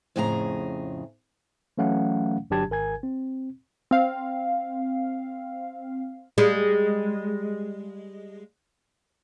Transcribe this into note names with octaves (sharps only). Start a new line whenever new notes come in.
F2 A2 C#3 G#4 A4 A#5
E3 F#3 A3 C#4 F5 F#5
G1 F#3 D4 G4 A5 G#6
G#1 A#4 G#5 G#6
C4
C4 F5
G3 G#3